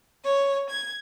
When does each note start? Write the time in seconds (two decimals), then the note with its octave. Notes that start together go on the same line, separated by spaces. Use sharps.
0.24 C#5
0.70 G#6